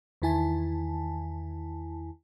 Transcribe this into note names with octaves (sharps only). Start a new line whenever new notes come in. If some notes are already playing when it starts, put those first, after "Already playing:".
E2 D#3 E4 G#5 A5